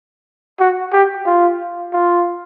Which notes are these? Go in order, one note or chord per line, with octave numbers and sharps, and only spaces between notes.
F#4
G4
F4
F4